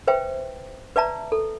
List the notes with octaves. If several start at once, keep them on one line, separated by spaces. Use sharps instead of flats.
B4 C5 E5 G5
B4 D5 E5 A5 A#5
A4